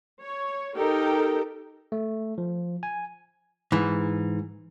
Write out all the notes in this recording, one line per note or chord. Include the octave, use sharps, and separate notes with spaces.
C#5
D#4 G4 A4 A#4 G5
A3
F3
G#5
G#2 E3